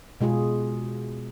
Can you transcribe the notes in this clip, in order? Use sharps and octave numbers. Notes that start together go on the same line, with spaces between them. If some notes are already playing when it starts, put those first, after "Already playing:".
B2 G#3 F4 G#4